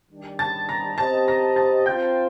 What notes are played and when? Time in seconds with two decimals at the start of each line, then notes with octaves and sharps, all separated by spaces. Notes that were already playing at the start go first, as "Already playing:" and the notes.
0.10 D#3 G3 D4 G4 D5
0.39 A5 A6
0.69 A#5 A#6
0.98 C4 G4 C5 D#5 A5 A6
1.28 A#5 A#6
1.56 A5 A6
1.86 C4 F4 C5 F5 G5 G6